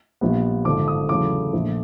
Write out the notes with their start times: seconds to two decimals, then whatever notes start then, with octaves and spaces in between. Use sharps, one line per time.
0.21 A#1 A#2 G3 B3
0.65 G#1 G2 D3 F3 D6
0.88 D#6
1.09 E2 C#3 F#3 A3 D6
1.53 A#1 A#2 F3 A3